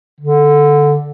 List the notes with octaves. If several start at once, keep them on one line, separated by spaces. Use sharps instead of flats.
D3